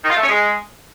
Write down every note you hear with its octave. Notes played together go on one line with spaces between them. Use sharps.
D#3
F4
A3
C#4
G#3